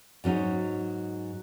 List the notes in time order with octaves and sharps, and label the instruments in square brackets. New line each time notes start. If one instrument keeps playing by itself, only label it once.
[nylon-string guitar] G#2 F#3 C#4 D#4